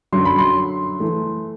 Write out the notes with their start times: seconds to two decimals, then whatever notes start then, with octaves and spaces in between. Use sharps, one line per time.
0.13 F#2 D3 F#3 C6
0.25 B5
0.38 C6
1.00 E3 A3